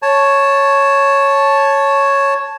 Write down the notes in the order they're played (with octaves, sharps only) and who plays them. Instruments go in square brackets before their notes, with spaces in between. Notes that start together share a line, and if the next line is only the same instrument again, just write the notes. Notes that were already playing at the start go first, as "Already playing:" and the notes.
[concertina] C#5 A5